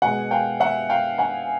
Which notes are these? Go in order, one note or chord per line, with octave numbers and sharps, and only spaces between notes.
B2 G#3 F#5 G#5
F5 G5
E5 F#5
F5 G5
F#5 G#5